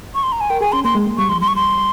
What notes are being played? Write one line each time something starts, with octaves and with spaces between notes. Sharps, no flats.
C#6
C6
A#5
G#5
A#4 G5
G#4 G#5
C#4 C6
A#3 C6
G#3
A#3
G3 C#6
F3 C6
G3 C6
C#6
C6